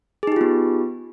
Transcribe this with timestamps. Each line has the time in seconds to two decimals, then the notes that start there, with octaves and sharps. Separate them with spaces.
0.23 G#4
0.27 D#4
0.32 G4
0.36 F4
0.41 B3